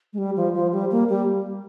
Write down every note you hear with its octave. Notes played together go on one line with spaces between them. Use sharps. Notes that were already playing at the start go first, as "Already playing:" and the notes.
G#3
G3
F3
F3
G3
A#3
G3